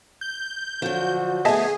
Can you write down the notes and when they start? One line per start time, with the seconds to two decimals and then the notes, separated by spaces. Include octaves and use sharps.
0.21 G6
0.82 D3 F3 F#3 F#4
1.45 A3 B3 G#4 D#5 E5 A5